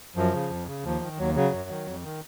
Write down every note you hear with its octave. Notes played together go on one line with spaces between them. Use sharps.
F#2 F3
C#3
F2
C#3
D#2 F3
D#3
D#2 F#3
C#3 F#3
F#2
D#3
F2
D#3